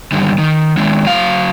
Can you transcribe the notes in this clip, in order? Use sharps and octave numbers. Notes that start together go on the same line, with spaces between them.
G2 D3 D#3 G3
D#3
D#3 G#3 D4
F#3 F5